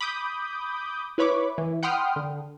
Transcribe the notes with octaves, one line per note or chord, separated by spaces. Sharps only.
B5 D6 D#6 G6
E4 B4 C#5 B5 C#6 D6
E3
F#5 G5 B5 C6 D#6 F6
D3